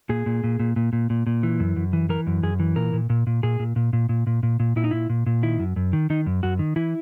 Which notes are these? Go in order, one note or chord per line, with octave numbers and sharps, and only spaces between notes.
A#2 G#4
A#2
A#2
A#2
A#2
A#2
A#2
A#2
E3
F#2
F#2
E3
E3 A#4
F#2
F#2 G#4
E3
A#2 A#4
A#2
A#2
A#2
A#2 G#4
A#2
A#2
A#2
A#2
A#2
A#2
A#2
A#2 E4
D#4
A#2 E4
A#2
A#2
D#3 E4
F#2
F#2
D#3
D#3 D#4
F#2
F#2 F#4
D#3
E3 E4